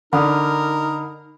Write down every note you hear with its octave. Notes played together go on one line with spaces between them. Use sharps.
D3 D#4 A#4 B5 D#6 F6